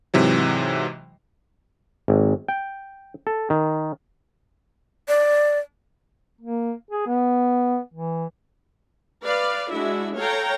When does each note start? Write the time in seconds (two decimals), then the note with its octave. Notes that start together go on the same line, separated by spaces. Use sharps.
0.14 G#2 C3 E3 F#3
2.08 G#1
2.48 G5
3.27 A4
3.50 D#3
5.08 D5
6.41 A#3
6.91 G#4
7.07 B3
7.94 E3
9.24 B4 D5 F5
9.71 G#3 D4 E4 F#4 E5
10.17 A4 C#5 F5 G5 A#5